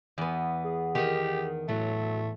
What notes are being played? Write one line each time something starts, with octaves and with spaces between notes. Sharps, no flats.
E2 B3
G#4
D#3 G4
A2 F#3 A3